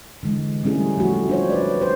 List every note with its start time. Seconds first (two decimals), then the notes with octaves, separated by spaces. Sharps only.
0.23 D3 E3 G#3
0.64 G3 A3 C#4 E4 G#4
0.98 F3 A3 F#4
1.29 D4 C5 C#5
1.50 B4 D5
1.81 C5